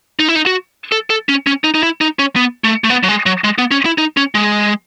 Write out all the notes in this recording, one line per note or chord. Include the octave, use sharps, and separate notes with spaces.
D#4
E4
D#4
F#4
A4
A4
C#4
C#4
D#4
D#4
E4
D#4
C#4
B3
A3
A3
B3
F#3
G#3
F#3
G#3
B3
C#4
E4
D#4
C#4
G#3